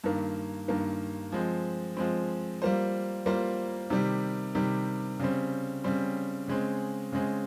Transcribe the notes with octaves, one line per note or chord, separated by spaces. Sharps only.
G2 D#3 A#3
G2 D#3 A#3
F3 G#3 C4
F3 G#3 C4
G3 A#3 F4 C5
G3 A#3 F4 C5
C3 D#3 G3
C3 D#3 G3
C#3 G3 C4
C#3 G3 C4
C#3 G#3 C4
C#3 G#3 C4